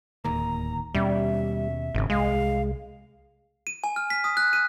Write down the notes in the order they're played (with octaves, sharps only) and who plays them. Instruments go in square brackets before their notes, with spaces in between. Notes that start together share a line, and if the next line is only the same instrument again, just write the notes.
[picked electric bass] D1 D#2 A#3 [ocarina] A#5
[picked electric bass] D#2 B2 C#4 [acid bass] G3 [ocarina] E5
[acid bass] G#1 [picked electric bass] G#2 C#3
[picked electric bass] C2 [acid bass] G#3 [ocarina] F5
[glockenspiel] D#7
G#5
F6
B6
D#6
F#6
D#7